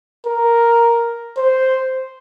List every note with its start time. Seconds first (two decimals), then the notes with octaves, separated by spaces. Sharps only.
0.27 A#4
1.37 C5